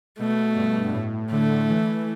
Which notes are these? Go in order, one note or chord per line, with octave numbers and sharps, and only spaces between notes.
B2 A3
G2
A2
D3 A3
E3